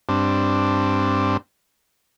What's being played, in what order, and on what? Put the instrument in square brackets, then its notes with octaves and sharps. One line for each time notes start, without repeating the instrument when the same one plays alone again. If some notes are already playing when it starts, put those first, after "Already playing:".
[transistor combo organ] G2 C4 D4